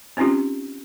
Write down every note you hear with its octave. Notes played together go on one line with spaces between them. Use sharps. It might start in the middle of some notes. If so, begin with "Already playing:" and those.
C4 C#4 D#4 F4 G4